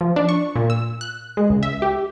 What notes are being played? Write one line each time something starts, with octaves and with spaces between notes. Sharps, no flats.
F3
D4
C#6
A#2
E6
F#6
G#3
C#2
E5
G4